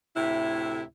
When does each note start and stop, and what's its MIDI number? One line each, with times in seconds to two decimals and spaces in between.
0.15 0.83 38
0.15 0.83 45
0.15 0.83 48
0.15 0.83 64